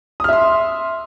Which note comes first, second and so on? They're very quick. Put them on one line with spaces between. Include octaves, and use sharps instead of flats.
D#6 F6 E5 C6